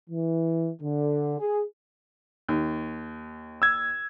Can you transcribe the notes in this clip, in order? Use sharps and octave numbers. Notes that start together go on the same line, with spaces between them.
E3
D3
G#4
D#2
E6 G#6